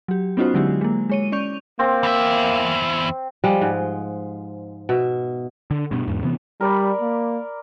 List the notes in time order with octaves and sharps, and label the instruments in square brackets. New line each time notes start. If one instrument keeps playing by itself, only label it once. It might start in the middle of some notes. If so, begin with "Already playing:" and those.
[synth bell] F#3 G4
B3 C#4 D#4 F4 F#4 C5
D3 F#3 G#3 E4 F#4 G4
G#3 A#3
G#3 C#5 D#7
C#4 D5 C#6 G6 F7
[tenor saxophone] A#3 [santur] C4
[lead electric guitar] E2 E5
[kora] F3 G3 G#3
G#2
B2 E5
[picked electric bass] D3
G2 B2
E2 G#2
C3 E3 B3
[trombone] G3 [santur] A#4 D5 B5
[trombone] A#3